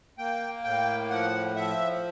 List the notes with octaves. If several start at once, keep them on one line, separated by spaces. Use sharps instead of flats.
A#3 G5
A2 G5
F3 F#5
F3 E5